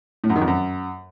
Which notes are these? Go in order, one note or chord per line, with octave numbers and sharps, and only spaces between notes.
A2
F#2
D#3
F2
F#2